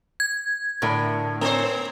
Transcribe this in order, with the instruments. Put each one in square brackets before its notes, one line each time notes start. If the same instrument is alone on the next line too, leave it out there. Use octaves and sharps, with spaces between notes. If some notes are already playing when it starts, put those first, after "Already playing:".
[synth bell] G#6
[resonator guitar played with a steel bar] A2 D3 [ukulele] A#4 E5 B5
[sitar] B3 C5 [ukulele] A#4 C#5